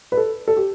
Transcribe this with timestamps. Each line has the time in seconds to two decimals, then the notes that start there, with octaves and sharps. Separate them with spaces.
0.12 B4
0.17 A4
0.48 A4
0.57 G4